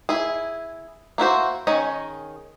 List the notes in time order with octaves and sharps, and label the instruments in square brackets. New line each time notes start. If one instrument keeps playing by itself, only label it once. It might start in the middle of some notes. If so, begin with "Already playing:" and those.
[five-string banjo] E4 G#4
A#3 E4 F#4 C5
D#3 C#4 G#4 D#5